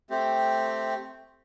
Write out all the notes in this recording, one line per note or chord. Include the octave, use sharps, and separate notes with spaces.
A3 C4 G4